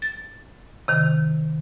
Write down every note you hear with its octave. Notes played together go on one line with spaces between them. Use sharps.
A6
C3 D#3